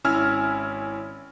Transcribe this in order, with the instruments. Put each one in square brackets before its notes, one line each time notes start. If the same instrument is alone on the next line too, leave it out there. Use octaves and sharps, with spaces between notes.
[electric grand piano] G#1 C#4 E4 G#5 E6 F6